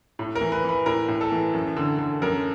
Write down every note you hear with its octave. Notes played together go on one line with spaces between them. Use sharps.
A2
A#4
E3
B4
E3 B4
A2 A#4
A2
A4
E3
F#2
D3
D3
F#2 A#4